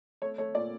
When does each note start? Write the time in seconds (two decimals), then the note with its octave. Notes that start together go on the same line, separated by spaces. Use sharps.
0.22 A3 C#5
0.38 A3 C#5
0.54 A#2 D5